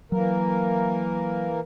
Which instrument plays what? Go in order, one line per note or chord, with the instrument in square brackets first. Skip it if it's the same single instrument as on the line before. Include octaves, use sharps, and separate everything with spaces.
[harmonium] E3 A#3 A#4 [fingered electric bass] F#3